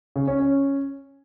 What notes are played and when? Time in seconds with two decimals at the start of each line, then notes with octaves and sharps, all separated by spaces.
0.16 C#3
0.27 C#4
0.39 C#4